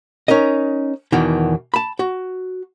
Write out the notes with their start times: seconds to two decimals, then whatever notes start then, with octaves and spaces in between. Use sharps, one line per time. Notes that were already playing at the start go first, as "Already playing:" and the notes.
0.28 C#4 D#4 A#4 D#5
1.12 E2 B2 D#3 E3
1.74 A5 B5
1.99 F#4